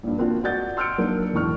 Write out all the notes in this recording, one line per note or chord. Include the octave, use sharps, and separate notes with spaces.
A#1 G2
A#3 C4 D4 F4 F#4
F#4 D5 F#5 G6 A6
C6 E6 F6 G6 C#7 D7
F#3 A#3 D4 D#4
E1 A2 D4 C#6 F6